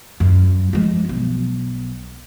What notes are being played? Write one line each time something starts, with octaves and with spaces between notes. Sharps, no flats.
F#2
F3 G#3
B1